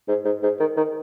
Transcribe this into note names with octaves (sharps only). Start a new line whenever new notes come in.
G#2
G#2
G#2
D#3
D#3